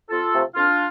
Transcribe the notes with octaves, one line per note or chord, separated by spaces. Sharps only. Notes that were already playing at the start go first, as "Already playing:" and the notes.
F2 F4 A4
C3 F3 A3
F2 D4 F4